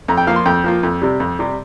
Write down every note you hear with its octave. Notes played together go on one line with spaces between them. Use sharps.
F2 A#5
G5
F3 A#3 F4 F5
C6
F2 G5
F3 A#3 F4
F2
C3 G3
F2
C3 G3